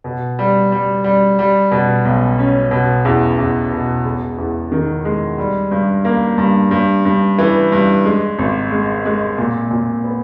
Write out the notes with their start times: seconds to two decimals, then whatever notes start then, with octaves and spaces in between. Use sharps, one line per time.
0.04 B2
0.39 G3
0.72 G3
1.04 G3
1.39 G3
1.71 B2
2.05 B1
2.39 C#4
2.71 B2
3.05 E2
3.38 E2
3.72 B2
4.04 E1
4.38 E2
4.72 D#3
5.05 G#3
5.38 G3
5.71 G2
6.05 A#3
6.38 G2
6.71 G2
7.05 G2
7.38 E3
7.72 G2
8.05 G#3
8.39 G#1
8.72 G#3
9.05 G#3
9.38 A#2
9.71 A#2
10.04 B3